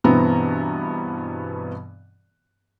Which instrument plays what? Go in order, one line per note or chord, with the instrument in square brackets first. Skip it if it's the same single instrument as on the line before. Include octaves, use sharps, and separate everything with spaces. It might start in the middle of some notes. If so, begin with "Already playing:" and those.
[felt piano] G2 B2 E3 B3 C4 A#5